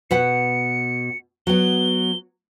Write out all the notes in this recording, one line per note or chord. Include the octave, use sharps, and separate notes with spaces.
B2 B4 F#5 C#7
F#3 B3 G7